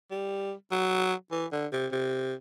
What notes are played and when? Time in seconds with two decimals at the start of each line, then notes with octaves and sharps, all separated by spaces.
0.11 G3
0.71 F#3
1.31 E3
1.52 D3
1.73 C3
1.92 C3